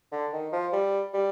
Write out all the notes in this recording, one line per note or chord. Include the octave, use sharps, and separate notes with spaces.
D3
D#3
F3
G3
G3